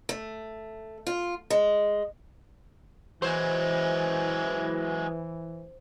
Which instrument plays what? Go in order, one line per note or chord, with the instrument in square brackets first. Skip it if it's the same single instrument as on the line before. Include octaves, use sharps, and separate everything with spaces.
[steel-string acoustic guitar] A3
F4
G#3
[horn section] E3 [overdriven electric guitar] F#3 G#3 [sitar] C5